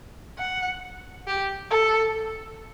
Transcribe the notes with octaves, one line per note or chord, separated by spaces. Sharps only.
F#5
G4
A4